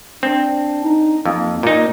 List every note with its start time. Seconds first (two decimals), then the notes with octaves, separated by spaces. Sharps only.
0.23 C4 D4
0.84 D#4
1.25 F2 A#3
1.63 A#2 A#3 D#4